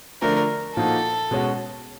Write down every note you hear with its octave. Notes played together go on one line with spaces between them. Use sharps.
D3 F3 A3 D4 A#4
A#2 F3 A#3 D#4 F#4 A4
B2 G#3 C#4 F#4